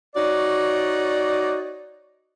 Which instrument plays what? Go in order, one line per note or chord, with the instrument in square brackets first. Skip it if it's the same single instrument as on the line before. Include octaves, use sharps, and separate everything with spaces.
[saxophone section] D#4 F#4 C#5 D5